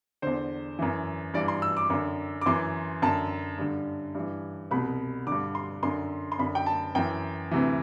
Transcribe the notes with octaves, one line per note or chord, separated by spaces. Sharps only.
E2 D3 C5
F#2 E3
G2 E3 D5
C6
E6
D6
F#2 D3
D6
F#2 E3 C6
F#2 D3 A5
G2 D3
G2 E3
C2 B2 B5
D3 D6
G2
C6
F#2 D3 C6
C6
F#2 D3 B5
G5
A5
F#2 E3 G5
D2 C3 E3